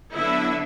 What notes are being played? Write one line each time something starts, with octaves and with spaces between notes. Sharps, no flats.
D3 F#3 B3 D4 E4 A4 E5